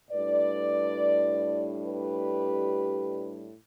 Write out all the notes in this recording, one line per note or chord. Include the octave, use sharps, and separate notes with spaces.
A2 G3 D4 B4 D5
G4 B4